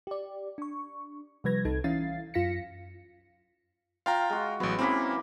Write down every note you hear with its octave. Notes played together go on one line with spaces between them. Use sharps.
G4 D5
D4 C#6
C3 F3 G3 B4 G#6 A#6
C2 C3 D#4 A4 G#6
E3 C#4 E4 F5 A6 C7
F#2 F4 F5 A#6 B6 C#7
F4 F5 G5 A#5
G#3 F#4
A1 F#3 B3
E3 A#3 C4 C#4 B5